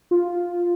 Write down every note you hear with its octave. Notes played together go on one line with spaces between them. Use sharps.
F4